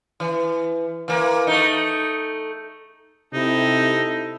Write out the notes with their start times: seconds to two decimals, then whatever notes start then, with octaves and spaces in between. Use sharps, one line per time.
0.20 E3
1.08 E3 A#3
1.47 A3 D#4
3.33 C3 D#4 E4 A4